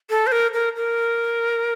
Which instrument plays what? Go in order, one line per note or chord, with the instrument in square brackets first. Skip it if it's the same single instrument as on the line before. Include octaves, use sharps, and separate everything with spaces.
[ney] A4
C5
A#4
A#4
A#4